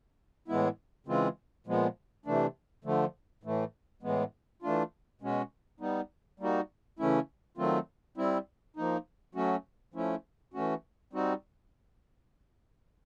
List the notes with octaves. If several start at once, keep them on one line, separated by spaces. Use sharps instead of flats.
A2 E3 G#3 B3 E4
C#3 E3 G#3 C4 F4
A#2 F3 G#3 B3
C3 E3 A3 D4
D3 F3 A3
A2 E3 A3
A2 E3 G#3 B3
E3 A3 D4 F4
B2 G#3 C#4 F#4
G3 B3 D#4
G3 A#3 D#4 F#4
C#3 E3 A3 C#4 E4
D#3 F#3 A3 C4 F4
G3 C4 E4
F3 A#3 D#4
F#3 A3 C#4 F#4
F3 A3 C#4 E4
E3 A3 C#4 F#4
G3 C4 D#4 F#4